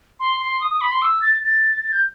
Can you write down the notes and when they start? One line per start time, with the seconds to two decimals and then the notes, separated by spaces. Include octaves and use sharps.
0.20 C6
0.41 C6
0.61 D#6
0.71 D#6
0.81 B5
0.91 C6
1.02 E6
1.22 A6
1.44 A6
1.84 A6
1.92 G6